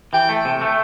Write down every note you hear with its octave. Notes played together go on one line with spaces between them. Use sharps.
E3 G5
A3
C3
A3